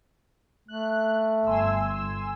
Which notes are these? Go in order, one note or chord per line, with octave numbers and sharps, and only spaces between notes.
A3 F#6
G1 G#5 C6 E6